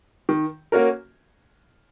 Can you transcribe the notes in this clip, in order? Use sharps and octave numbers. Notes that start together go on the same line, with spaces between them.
D#3
A#3 C#4 F#4 A#4